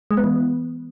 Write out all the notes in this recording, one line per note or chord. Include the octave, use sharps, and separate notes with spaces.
G#3
B3
E3